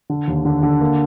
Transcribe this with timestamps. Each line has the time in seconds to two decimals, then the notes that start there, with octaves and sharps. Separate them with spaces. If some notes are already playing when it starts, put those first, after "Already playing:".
0.10 D3
0.28 D#2
0.45 D3
0.63 D3
0.81 A#3